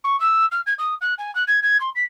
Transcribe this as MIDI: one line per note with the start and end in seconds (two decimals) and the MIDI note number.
0.04 0.19 85
0.20 0.46 88
0.51 0.61 89
0.66 0.74 92
0.78 0.94 87
1.01 1.14 90
1.18 1.34 80
1.35 1.43 90
1.48 1.60 92
1.63 1.79 92
1.80 1.90 84
1.95 2.04 95